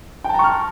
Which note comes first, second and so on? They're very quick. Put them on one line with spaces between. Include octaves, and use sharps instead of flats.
G5 A5 A#5 C#6 F6